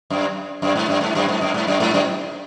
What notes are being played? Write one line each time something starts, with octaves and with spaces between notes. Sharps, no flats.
F#2
F#2
G#2
F#2
G#2
F#2
G#2
F#2
G#2
F#2
G#2
F#2